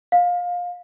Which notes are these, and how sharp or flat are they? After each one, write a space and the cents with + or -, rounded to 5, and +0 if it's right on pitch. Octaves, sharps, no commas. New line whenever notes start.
F5 +25